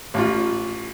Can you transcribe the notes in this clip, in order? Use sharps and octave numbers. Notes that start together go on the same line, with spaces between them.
A1 F4